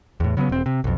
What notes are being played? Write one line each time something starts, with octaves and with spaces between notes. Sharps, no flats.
E2 A2
C#3 F#3 A#3 B3
E1 C4
C3
B1 F2